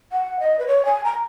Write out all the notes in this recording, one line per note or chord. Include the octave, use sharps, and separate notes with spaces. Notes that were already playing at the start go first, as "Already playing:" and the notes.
F#5
D#5
B4
C#5
G#5
A#5